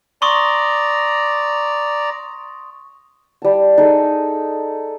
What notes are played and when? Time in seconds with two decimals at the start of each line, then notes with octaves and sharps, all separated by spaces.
0.22 D5 A#5 C6 C#6 D#6
3.42 G3 A5
3.78 D#4 G#4 A4